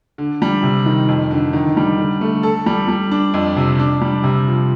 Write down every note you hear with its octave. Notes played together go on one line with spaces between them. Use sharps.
D3
G3
C3
D#3
F2
D3
D#3
G3
D3
A3
A4
G3
G3
D4
F2
C3
D4
G3
C3
F3